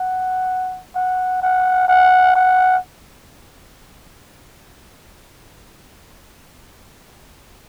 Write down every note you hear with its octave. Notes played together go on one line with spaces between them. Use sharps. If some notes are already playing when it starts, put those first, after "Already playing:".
Already playing: F#5
F#5
F#5
F#5
F#5